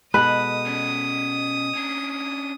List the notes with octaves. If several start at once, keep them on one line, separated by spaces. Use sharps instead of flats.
B2 G#3 A4 B4 D#6
C#4 D5
C#4 D4